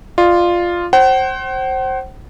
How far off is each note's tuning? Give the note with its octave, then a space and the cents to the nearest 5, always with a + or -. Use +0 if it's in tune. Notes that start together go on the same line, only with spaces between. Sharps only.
F4 +0 D5 +35
C5 +20 F#5 +45